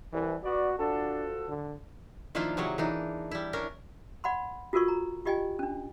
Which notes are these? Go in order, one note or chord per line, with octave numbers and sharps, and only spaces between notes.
C2 E3
B3 F#4 D5
F3 D4 F#4 A4
D3
D#3 F3 A#3 D4 E4 F4
C3 F#3 G#4 C#5
E3 D4 D#4
G3 E4
C#4 D4 A#4
D5 F#5 B5 C6
F4 F#4 A4 A#4 D5 C#6
A#5
F4 G4 D5 D#5 G5 G#5
C#4 D4